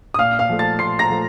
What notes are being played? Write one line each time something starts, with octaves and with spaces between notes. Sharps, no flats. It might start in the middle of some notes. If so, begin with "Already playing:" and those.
D#6
A#2 F5 F6
F5 F6
F3 A3
A5 A6
A#2 C6 C7
A#5 A#6
F3 A3